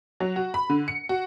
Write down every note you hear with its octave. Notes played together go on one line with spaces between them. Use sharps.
F#3
F#4
B5
D3
C#7
F#4